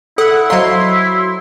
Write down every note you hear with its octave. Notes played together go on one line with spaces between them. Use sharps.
E4 A4 F#5
F#3 C5 D#5 F5 A#5 C6